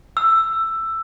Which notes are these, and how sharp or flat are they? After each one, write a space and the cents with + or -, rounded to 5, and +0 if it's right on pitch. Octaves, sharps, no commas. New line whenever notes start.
E6 +10